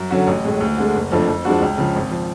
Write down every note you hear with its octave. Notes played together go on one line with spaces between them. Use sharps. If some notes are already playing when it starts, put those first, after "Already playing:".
Already playing: F#2
D3 F#3 C#4 F#4
A1
A2 G#3
D2
D3 G#3
F#1
F2 F3 A3 D4
F2
F3 G#3 D4 F#4
C#2
C#3 F3
G#1
F3